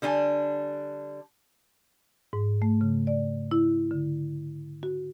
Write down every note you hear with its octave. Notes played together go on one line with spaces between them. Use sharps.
D3 G3 D4 G#5
G#2
A3
C#3
D5
E4
D3
F#4